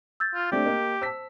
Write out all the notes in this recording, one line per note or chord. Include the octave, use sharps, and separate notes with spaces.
E6 G6 A6
F4
A3 C4 D4 G4
A#3 D#5
C5 A5 E6 B6